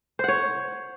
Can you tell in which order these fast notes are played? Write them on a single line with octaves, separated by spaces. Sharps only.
C5 F#5 C#5